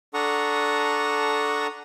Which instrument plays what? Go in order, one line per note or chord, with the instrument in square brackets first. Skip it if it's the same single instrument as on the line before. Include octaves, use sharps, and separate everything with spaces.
[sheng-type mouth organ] D4 A4 F#5 A#5 C#6 D#6